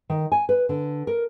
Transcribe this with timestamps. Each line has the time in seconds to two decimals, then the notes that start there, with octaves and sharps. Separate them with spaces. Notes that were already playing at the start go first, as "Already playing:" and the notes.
0.10 D#3
0.32 G#5
0.49 B4
0.69 D3
1.07 A#4